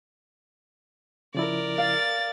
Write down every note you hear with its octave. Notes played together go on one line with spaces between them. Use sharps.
C#3 F3 E4 A#4 D5
F5 A6